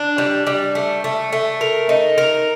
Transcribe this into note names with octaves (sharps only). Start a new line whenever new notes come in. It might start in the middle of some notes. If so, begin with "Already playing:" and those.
Already playing: D4
G3
G3
A3
A3
A3
A#4
D#4
A#4